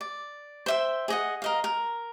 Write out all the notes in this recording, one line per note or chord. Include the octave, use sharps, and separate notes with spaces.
D5
C5 E5 G5
G#4 D#5 F#5
A#4 D#5 F5
A#4